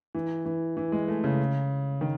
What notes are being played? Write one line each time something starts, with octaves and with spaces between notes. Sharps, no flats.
E3
E3
E3
G#3
A3
C#3
D#3